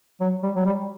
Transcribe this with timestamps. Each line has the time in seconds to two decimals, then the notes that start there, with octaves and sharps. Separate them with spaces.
0.21 F#3
0.43 G3
0.56 F#3
0.65 G3